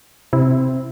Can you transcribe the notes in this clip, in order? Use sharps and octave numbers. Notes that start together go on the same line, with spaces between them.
C3 C4 E4